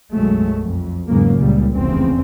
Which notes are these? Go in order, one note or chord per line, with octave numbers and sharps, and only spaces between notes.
B1 F#2 F#3 G#3 A3
F2
E2 G#2 C#3 F#3 A#3
C#2 A#2 G3
F1 E2 C#3 C4